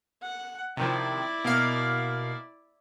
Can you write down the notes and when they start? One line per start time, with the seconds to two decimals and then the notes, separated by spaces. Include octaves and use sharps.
0.22 F#5
0.77 C3 D#3 F3 E4 D5
1.44 B2 A#3 F5